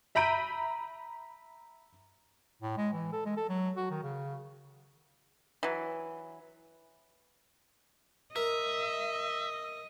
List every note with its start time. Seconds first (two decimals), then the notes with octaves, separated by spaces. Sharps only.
0.15 E5 A#5 B5 G6 D7 D#7
2.62 A2
2.77 G#3
2.92 E3
3.13 A4
3.25 G#3
3.37 A4
3.49 F#3
3.77 F#4
3.90 D#3
4.03 C#3
5.63 E3 F#3
8.36 A#4 D#5 E5